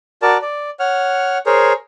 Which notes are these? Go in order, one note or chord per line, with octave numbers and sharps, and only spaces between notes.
F#4 A#4 D5 A5
D5
C#5 F#5 F6
G#4 A#4 C5 C#5